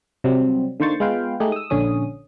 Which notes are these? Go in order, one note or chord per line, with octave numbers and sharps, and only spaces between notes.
C3 F#3 G3 C4
D3 D#3 A#3 C5 C#6 A6
G#3 B3 F4 B4 F5 G5
G#3 A3 D#4 G4 G#4
D#6 E6
A#1 D3 C#4 D#6